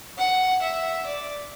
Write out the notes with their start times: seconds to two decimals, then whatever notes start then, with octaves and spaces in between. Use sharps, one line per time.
0.18 F#5
0.62 E5
1.06 D5